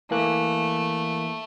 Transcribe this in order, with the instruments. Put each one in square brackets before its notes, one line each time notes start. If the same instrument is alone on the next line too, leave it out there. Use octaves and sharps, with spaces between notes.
[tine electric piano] E3 A#3 F#6 [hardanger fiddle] A3